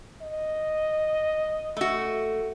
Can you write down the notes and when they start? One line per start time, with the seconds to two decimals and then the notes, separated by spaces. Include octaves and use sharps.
0.22 D#5
1.77 A3 F#4